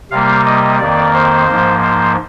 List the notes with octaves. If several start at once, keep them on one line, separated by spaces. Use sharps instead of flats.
C3 G3 A#3 F5
D#5
F2 D#3 A#3 D5
C5
G#2 F3 A#3
C5